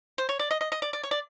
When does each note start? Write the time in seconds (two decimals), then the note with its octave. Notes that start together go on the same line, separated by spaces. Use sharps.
0.18 C5
0.29 C#5
0.39 D5
0.51 D#5
0.61 D#5
0.72 D#5
0.82 D5
0.93 D5
1.03 C#5
1.11 D5